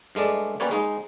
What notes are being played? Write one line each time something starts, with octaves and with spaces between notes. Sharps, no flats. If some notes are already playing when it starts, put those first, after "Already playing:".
G2 G#3 A3 D5
G3 A#3 C#4 B4 C#5 D5
G#3 D#4